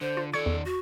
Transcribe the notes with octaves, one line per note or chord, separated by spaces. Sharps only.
D3 C5
F4
D#3 A4 D5 C#6 G#6 C#7
E2
F#4